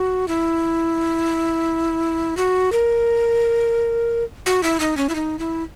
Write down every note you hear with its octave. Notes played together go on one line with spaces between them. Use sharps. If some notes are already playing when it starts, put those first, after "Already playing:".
Already playing: F#4
E4
F#4
A#4
F#4
E4
D#4
C#4
E4
D#4
E4